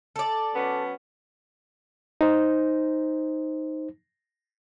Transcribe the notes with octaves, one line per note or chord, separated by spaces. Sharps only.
A4 D5
F#3 B3 C#4
D#4 C5